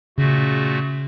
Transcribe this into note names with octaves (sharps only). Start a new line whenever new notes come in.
A#2 C#3 A3 F#4